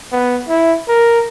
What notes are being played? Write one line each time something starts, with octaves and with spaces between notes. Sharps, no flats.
B3
E4
A#4